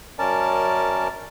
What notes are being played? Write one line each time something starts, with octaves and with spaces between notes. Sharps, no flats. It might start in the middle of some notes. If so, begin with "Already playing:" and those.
F#2 C#4 A#4 D5 A5